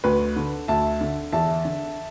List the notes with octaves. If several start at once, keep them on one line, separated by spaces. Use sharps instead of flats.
D2 B4
D3
D2 E5 A5
D3
E2 E5 A5
D3